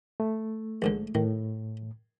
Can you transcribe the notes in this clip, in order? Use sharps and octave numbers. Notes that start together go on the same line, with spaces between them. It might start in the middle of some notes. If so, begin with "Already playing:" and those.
A3
A#1 G#2 D3
A2 D#3